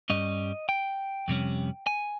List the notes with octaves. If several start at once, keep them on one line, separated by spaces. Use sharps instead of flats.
G2 G3 C#4 D#5
G5
F2 C3 G3 C#4
G#5